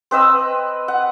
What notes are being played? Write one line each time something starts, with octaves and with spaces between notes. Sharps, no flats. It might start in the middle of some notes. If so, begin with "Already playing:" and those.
C4 B4 D#5 E6
F#5